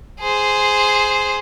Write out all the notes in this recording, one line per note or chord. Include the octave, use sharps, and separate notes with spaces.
G#4 C5